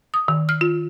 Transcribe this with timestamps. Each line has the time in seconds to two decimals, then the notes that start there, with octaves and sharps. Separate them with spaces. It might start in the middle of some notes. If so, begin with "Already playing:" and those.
0.14 D#6
0.28 D#3
0.49 F6
0.61 F4